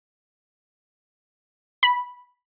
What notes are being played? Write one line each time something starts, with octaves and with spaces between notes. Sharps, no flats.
B5